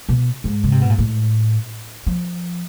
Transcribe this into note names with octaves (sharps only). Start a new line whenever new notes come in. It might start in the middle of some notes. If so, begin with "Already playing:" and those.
B2
G#2
C#3
C3
B2
A#2
A2
F3